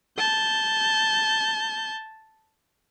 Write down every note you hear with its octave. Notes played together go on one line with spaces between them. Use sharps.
A5 G6